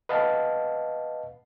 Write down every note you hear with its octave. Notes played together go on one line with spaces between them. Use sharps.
B4 D#5 F5 F#5 A5